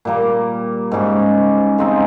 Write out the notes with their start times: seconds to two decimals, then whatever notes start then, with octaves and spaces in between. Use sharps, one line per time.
0.05 A#2 G3 A#3
0.92 G#2 G3 C#4
1.78 C#3 G#3 C4 D#4